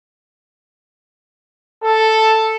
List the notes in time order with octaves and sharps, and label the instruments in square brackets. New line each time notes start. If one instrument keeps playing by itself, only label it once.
[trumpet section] A4